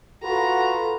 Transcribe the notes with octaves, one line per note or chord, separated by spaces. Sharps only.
F4 F#4 A4 B4 A#5